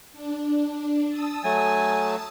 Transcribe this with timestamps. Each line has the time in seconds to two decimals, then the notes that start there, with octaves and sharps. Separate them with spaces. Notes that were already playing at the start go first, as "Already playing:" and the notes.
0.13 D4
1.08 A5 D#6 E6
1.44 F#3 A3 G#5